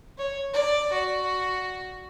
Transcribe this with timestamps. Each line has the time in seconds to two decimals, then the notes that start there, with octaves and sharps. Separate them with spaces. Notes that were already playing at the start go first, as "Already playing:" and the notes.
0.18 C#5
0.53 D5
0.92 F#4